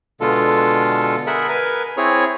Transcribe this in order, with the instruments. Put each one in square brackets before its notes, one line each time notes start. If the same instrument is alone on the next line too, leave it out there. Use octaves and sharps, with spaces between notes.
[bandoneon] B2 D3 G#3 F4 A4
G#4 A#4 E5 F#5 B5
A#4 B4 G#5
C4 E4 G#4 C#5